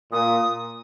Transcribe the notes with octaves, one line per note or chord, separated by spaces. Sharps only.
A#2 D#6